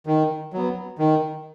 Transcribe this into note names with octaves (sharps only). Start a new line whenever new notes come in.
D#3
F#3 B3
D#3